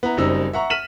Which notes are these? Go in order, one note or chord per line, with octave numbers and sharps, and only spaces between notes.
B3 E4 A#5
F#1 F#2 G3 C4 D#4 E6
E5 F#5 A#5 C#6
F6 B6 D#7 E7 F#7